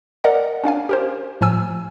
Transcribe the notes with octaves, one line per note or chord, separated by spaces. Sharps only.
A#4 D5 D#5 F#5 A#5
C#4 D4 F5 G#5
G4 A#4 C5
A2 F3 G#5 E6